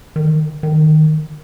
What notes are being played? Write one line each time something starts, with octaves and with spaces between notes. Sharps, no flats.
D#3
D#3